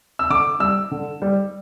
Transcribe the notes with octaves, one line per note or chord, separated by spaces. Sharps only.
E6
D3 D6
G3 E6
D3
G3